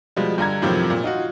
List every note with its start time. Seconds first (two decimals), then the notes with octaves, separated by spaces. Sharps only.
0.16 B2 F3 G3 G#3
0.38 G2 D3 A#5 G#6
0.62 F#2 A2 C3 D#3 F3 F#3
0.90 A#2
1.03 D#4 F4 F#4